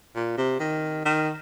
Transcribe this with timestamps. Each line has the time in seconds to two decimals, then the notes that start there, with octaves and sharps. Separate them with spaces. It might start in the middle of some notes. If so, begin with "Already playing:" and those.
0.15 A#2
0.37 C3
0.60 D#3
1.05 D#3